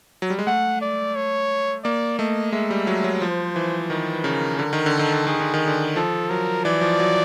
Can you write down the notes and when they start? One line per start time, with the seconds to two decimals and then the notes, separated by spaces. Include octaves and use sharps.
0.22 F#3
0.30 G3
0.39 G#3
0.47 A3 F#5
0.81 D5
1.16 C#5
1.84 A#3 D5
2.19 A3 D#5
2.52 G#3 E5
2.70 G3
2.87 F#3
3.04 F#3
3.22 F3 C5
3.56 E3
3.90 D#3 B4
4.24 C#3 A#4
4.59 D3 A#4
4.73 D#3
4.86 D3
4.93 A4
4.99 D#3
5.13 D3
5.27 D#3 G#4
5.40 D3
5.54 D#3
5.68 D3
5.96 F3 A4
6.30 F#3 A#4
6.65 E3 D5
6.81 F3
7.00 F#3